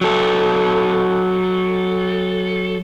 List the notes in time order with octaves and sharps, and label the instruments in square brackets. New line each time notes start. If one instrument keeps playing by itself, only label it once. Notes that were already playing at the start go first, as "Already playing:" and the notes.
[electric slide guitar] F#3 A4